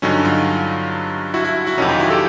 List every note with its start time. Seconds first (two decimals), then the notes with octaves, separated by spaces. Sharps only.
0.02 G2 D3 F#3 C#4 D#4
0.25 D#4 F4
1.34 E4 F#4
1.45 E4 F#4
1.67 E4 F#4
1.77 F2 C3 D#3 F#3 C#4 D#4
1.88 D#4 F4
1.99 E4 F#4
2.10 G4 A4